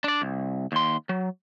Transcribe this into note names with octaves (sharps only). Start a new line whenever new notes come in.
D4 D5
C2
D#2 C6
F#3